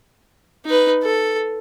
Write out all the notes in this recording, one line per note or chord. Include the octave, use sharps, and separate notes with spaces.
D#4 B4
A4